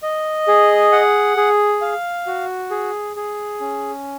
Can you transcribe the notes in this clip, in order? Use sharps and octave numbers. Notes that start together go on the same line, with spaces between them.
D#5
G#4
F#5
G#4
F5
F#4
G#4
G#4
C#4